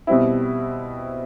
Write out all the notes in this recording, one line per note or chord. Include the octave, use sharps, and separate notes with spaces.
B2 G3 C4 E4